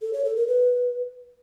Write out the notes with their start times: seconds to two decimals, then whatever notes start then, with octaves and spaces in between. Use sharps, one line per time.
0.02 A4
0.13 C#5
0.25 A4
0.36 A#4
0.48 B4